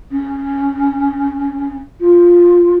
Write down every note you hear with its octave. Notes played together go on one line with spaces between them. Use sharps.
C#4
F4